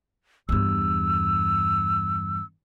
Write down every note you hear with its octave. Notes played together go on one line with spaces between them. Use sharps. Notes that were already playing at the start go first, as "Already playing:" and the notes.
E2 G2 E6